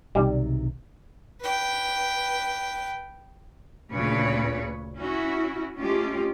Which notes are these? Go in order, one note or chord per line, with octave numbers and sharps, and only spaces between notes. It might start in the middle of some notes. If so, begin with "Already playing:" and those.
B1 C3 D#3 G3
B4 G5
D2 A#2 C#3 B4 C#5
C#4 E4 F#4
G#3 A3 C#4 F4 G4